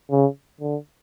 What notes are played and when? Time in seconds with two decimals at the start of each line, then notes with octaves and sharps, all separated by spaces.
0.11 C#3
0.61 D3